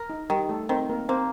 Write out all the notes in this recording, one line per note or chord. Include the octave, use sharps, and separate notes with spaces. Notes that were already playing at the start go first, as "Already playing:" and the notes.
Already playing: A#4
D#4
D#3 G3 G4
A3 A4
D#3 C4 C5
A#3 A#4
A#3 C4 C5